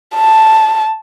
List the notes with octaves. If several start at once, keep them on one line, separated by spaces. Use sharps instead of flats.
A5